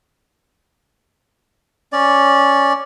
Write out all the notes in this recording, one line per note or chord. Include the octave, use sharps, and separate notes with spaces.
C#4 D5